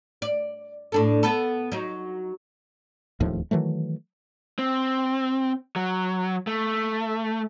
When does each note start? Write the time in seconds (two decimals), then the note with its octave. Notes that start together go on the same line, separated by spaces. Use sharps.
0.22 D5
0.92 A2 D4 A4
1.23 B3 A4
1.72 F#3 D#4
3.20 D1 D#2 A2 F3
3.51 D#3 E3 F#3 A3
4.59 C4
5.76 F#3
6.47 A3